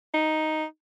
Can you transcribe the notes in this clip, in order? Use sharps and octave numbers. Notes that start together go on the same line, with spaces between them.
D#4